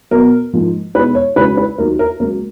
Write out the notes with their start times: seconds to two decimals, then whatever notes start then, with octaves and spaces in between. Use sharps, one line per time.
0.11 B2 F#3 B3 A#4
0.53 G#2 F3 A#3
0.94 B2 G#3 D#4 B4
1.15 C#5
1.36 C#2 C#3 F#3 C#4 B4
1.57 B4
1.78 D#2 D#3 F#3 A#3 D#4 A#4
1.99 A#4
2.20 C#2 C#3 F#3 A#3 A#4